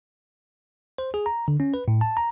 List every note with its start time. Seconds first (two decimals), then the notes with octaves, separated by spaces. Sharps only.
0.98 C5
1.14 G#4
1.26 A#5
1.48 D3
1.60 C#4
1.74 B4
1.88 A2
2.01 A5
2.17 A#5